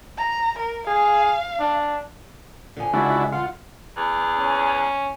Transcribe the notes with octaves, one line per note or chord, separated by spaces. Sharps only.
A#5
A#4
G#4 F5
D4
D3 F3 G#5
C#2 D4 E4 F#4
F4 F#5
E2
C#4